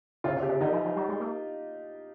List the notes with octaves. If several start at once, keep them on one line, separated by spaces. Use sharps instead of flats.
C#3 F4
C#3
G4
C#3
D#3 D#4
F3
F3
G3
G#3
A#3